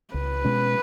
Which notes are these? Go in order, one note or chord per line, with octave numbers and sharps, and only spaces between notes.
C#2 B4
B2 G#3 C#4